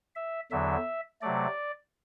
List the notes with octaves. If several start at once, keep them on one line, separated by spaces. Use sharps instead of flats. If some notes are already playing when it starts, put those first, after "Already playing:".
E5
E2 D3 F#3 E5
C3 F#3 A3 D5